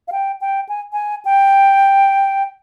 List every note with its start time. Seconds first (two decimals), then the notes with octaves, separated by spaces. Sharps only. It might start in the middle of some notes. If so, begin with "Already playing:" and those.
0.08 F5
0.12 G5
0.41 G5
0.69 G#5
0.93 G#5
1.25 G5